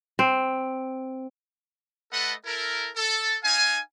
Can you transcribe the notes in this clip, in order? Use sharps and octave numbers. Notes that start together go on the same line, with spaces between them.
C4
A3 A4 B4 D#5 F#5
E4 A4 A#4
A4
D#4 F5 G#5